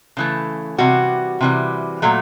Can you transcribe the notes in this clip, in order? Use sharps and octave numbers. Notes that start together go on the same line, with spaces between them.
C#3 E3 A3
C3 E3 G3 F#4
C3 E3 G3
A#2 F#3 A3